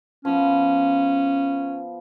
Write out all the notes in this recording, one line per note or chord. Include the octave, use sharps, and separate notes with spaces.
F3 B3 C#4